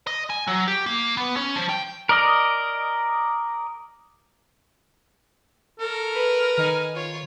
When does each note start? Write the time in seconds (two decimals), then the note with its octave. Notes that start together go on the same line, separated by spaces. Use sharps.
0.07 D#5
0.30 G#5
0.47 F#3
0.68 G4
0.86 A#3
1.17 B3
1.37 C#4
1.56 F3
1.69 G5
2.09 A#4 D5 D#5
5.80 A4 A#4 C#5
6.13 B4
6.58 D#3 D#4 G#5
6.95 F4 C#5